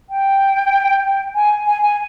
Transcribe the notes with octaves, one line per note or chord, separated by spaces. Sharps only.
G5
G#5
G#5
G#5